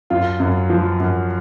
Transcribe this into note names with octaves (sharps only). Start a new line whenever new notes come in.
F#2 F4
F#2
F3
F#2